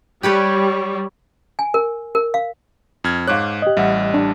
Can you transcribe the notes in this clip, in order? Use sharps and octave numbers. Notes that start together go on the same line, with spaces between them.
G3 G4 B4 C#5
G#5
A#4
A#4
F5
F2 F6 G#6
G#2 C#5 F5 D6 F#6
G4 D#5
A1 G3 E5 F#5
D4